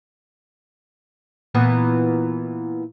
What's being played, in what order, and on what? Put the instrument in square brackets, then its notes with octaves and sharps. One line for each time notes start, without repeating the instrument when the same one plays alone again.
[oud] A#2 E3 B3